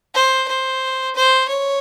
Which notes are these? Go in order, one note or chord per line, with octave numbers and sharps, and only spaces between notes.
C5
C5
C5
C#5